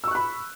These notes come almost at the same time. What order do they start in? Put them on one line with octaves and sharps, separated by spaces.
E6 C#6 F#6 B5